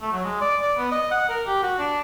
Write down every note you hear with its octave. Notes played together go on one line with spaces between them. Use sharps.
A3
F#3
G#3
D5
D5
B3
D#5
F#5
A#4
G4
F#4
D4